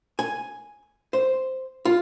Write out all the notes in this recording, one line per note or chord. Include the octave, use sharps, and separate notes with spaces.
G#5
C5
F4